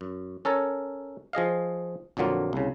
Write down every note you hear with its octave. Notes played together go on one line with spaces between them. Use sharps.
F#2
C#4 A4 A#4 C#5
F3 G#4 D#5 F5
A#1 F2 D3 F#3 A#3 F4
C2 C#3